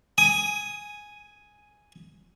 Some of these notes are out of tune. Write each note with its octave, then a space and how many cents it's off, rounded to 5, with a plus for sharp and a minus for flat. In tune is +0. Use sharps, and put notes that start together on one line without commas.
G#5 +0 D#6 +20